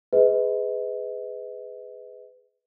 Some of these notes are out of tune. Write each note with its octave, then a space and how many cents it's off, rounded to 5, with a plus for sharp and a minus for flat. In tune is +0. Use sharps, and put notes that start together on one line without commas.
G#4 +0 B4 +25 D#5 +30